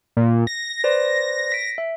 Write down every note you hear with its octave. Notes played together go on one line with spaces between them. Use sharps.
A#2
A#6
B4 C5 D5
B6 D7
E5